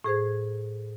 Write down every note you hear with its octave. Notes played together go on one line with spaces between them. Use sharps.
A2 G#4 C5 G#6